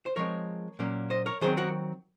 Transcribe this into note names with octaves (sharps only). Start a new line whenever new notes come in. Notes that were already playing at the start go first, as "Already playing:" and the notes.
C5
F3 G#3 C4 A#4 C#5
A#2 F#3 A#3 C#4
C5 D#5
A#4 C#5
D#3 F#3 C4 G#4 C5
F#4 A#4